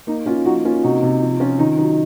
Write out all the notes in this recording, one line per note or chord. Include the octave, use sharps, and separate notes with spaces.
A#3 D#4
A#3 C#4 F4
F3 D#4 F#4
A#3 C#4 F4
C3 D#4 F#4
C3
F3
F3 C#4 F4
D#3 D#4
F#3 D#4